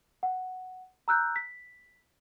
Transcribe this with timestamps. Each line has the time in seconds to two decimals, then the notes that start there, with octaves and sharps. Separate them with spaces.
0.23 F#5
1.08 A#5 E6 F#6 G6
1.36 B6